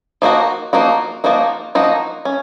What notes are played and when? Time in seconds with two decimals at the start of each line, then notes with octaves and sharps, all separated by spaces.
0.22 F3 A#3 D#4 F#4
0.73 F3 A#3 D#4 F#4
1.24 F3 A#3 D#4 F#4
1.75 F3 A#3 D#4 F#4
2.25 C#4